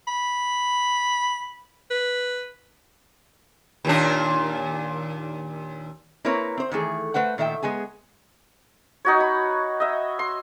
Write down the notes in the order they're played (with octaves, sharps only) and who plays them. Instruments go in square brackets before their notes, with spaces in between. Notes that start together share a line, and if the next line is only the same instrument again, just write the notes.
[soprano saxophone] B5
B4
[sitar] D#2 A#2 D4
[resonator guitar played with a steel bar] A#3 C4 E4 A#4 B4 C#5
C4 C5
D#3 E3 A3 G#4
A3 B4 C5 F#5
A#2 D#3 A3 E5 G5
G#3 B3 G#4 G#5
[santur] D#4 F#4 C#5
B5
D#5 E5
C6